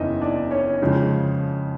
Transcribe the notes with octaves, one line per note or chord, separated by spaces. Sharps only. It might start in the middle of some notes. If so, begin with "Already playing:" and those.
Already playing: F#1 E2 C#3 D#4 E4 D#5 E5
D4 D5
C#4 C#5
F2 C#3 F3 G#3